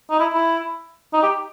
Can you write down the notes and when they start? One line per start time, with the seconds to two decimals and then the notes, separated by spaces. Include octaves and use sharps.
0.10 D#4
0.20 E4
0.34 E4
1.13 D#4
1.23 G4